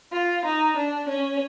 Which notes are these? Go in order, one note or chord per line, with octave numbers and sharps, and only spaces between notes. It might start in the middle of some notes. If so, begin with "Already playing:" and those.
F4
D#4
D4
C#4